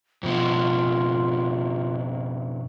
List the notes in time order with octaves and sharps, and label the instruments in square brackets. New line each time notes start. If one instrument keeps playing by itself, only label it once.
[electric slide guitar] F2 B2 [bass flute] F4